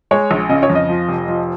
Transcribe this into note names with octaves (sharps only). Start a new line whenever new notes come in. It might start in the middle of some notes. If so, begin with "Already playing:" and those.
G#3 C#5
A#1
C#3 D#5
C#5
F2
D#5
F3
F1
F3